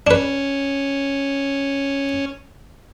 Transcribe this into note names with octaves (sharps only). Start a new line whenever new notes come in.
C#4 D4 B4